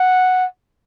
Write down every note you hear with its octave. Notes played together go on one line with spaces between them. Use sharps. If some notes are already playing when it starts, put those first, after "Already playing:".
Already playing: F#5